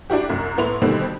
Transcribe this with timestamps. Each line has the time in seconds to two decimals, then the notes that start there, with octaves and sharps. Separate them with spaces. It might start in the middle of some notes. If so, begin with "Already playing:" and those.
0.10 D4 E4 F#4 G4
0.29 C2 F#2
0.57 A2 B3 E4 C6 F7
0.82 B2 D3 D#3 G3 C4